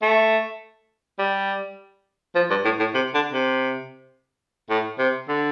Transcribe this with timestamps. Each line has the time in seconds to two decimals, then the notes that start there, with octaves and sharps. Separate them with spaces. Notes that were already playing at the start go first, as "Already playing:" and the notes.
0.02 A3
1.19 G3
2.35 F3
2.50 G2
2.65 A2
2.79 A2
2.94 C3
3.14 D3
3.33 C3
4.69 A2
4.99 C3
5.28 D3